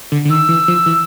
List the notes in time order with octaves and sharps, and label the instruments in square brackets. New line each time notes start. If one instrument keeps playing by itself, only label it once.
[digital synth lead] D3
D3
[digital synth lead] D#3 [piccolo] E6
[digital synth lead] E3
F3
E3